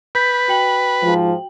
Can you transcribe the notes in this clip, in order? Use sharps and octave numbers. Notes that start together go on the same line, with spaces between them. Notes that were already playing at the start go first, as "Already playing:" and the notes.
B4 G6 B6
F#4 G5 F#7
G#2 F3